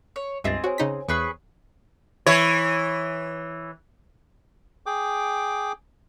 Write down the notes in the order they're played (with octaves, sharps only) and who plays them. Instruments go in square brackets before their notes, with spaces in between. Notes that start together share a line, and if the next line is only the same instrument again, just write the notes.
[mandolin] C#5
[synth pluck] C#2 G2 E5 [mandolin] C4 G#4 [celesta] D#5 A6
[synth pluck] F#4 [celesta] C5 C#5 G#5
[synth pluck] C#3 D#4 B6
[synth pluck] E2 [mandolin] G#4 B4 C#6
[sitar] E3 C#5
[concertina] G#4 G5 D6